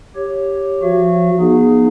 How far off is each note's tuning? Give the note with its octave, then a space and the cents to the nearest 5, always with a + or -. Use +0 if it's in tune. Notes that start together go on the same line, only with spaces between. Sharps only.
G4 +0 C#5 +0
F3 +0 F#4 -20 E5 +45
B3 -35 D#4 -30 G#4 +5